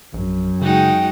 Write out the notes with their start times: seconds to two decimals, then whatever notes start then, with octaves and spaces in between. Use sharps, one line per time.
0.14 A#1 F#2
0.61 C#3 G#3 D#4 F#4 G5